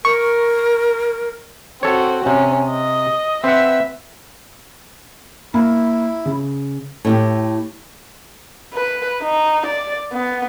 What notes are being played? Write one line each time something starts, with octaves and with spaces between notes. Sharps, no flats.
A#4 C#6
C4 F#4 A4 C#5
C3 C#4
D#5
C4 B4 E5 F#5
A#3 E4
C#3
A2 E4 G4
B4
D#4
D5
B3